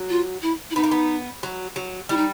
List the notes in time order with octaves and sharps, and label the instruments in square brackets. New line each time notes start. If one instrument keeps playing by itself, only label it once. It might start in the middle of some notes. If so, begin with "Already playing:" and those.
Already playing: [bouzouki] F#3
[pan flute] F4
E4
E4
[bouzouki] B3 [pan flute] D#4
[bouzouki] A#3
B3
F#3
F#3
[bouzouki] G3 [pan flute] E4
[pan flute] D#4